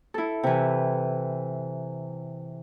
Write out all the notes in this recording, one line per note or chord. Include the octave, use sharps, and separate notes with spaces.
E4 A4
C3 E3